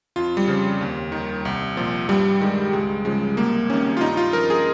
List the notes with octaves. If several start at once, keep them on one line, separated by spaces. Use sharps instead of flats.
F2 F4
G3
C#3 F3
D#2
D#3
C2
A#2 F3
G2 G3
D#3 G#3
C#2 G#3
C#3 F3 G#3
C2 A#3
C3 D#3 C#4
F4
G2 D#4
F4
F3 A#4
G#4